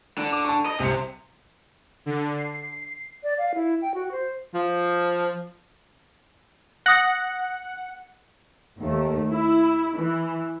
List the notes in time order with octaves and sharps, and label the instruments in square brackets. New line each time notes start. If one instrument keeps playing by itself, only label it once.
[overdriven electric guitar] D3
[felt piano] D6
A5 C#6
[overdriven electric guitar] D#5
[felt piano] C2 C#7 [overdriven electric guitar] C3
[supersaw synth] D3
C7
[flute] D5
F5
E4
G5
F#4
C5
[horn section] F3
[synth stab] F#5 [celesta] D#6 A#6
[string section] D#2 A3
E4
E3